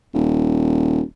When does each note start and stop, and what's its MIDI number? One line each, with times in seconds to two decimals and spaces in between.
0.14 1.01 27